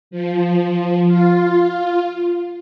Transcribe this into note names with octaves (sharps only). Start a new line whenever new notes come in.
F3
F4